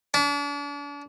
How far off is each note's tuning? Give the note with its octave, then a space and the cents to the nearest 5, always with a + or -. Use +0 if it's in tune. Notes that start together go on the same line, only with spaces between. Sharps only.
D4 -40